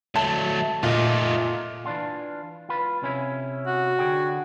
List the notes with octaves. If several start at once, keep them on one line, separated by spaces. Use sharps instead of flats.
F#3 A3 A5
A#2 A3 D#4
E3 D4 F4
F4 B4
C3 C#4 E4
F#4
D3 G#4 G5